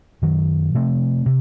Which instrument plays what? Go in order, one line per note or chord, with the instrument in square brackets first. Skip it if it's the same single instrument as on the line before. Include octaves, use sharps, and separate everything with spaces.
[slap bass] F#2 D#3 F#3
C3 F3 A3 C4
C3